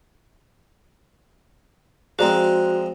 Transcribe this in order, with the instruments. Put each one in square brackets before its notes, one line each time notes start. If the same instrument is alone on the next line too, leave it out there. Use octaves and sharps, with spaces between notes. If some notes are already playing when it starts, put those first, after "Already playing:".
[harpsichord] F3 G#3 C4 [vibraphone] F#4 [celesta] G#4 D5 A#5